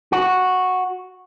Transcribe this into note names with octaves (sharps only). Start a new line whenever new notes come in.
F#4